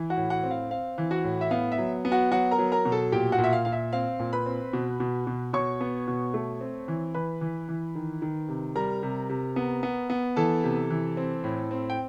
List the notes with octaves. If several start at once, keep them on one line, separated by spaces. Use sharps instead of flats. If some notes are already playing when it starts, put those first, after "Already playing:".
Already playing: E3
F#4 F#5
A2
F#4 F#5
C4
F5
C4 F5
E3
F#4 F#5
A2
E5
B3 F5
E5
F#3
B3
F#4 F#5
F#3 F#4 F#5
A#4 A#5
F#3
A#4 A#5
B2
A4 A5
A#2 G4 G5
F#4 F#5
A#2
E5
F5
A#2 F5
E5
C4 F5
A#2
B4 B5
C4
B2
B2
B2
B2 C#5 C#6
B3
B2
A3
C4
E3
E3 B4 B5
E3
E3
D#3
D#3
C3
G3 A#4 A#5
C3
C3
B3
B3
B3
E3 A4 A5
C3
E3
C4
A2
C4
G5